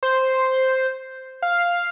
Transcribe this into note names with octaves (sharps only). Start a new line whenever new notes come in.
C5
F5